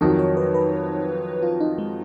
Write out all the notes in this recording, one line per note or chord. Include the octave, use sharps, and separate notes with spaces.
F2 D#3 F#3 D#4
C#5
B4
B4
F4
D#4
G#3